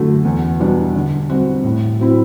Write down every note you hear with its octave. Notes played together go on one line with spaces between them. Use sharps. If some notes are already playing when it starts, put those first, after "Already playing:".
Already playing: F#2 D3 F#3 A3
E2
B2 G3 D4
D3
G3 C4 F#4
A2
F#3 C4 E4